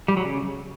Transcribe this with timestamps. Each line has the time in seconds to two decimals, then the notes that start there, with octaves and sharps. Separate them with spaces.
0.08 G3
0.17 F#3
0.25 C#3